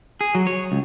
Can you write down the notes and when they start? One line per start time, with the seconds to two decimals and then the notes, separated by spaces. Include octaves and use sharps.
0.21 G#4
0.35 F#3
0.47 C#5
0.72 C#2